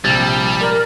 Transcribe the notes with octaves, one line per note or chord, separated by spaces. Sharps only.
A#1 C3 G3 G#6 A6
A#4 D5